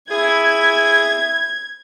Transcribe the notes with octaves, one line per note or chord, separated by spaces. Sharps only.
E4 G#4 G#6